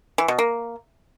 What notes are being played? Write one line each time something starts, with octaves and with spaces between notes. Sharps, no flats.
E3
B2
A#3